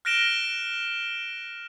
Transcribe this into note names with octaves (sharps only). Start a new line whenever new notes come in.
F6 F#6 A#6 D7 E7 G7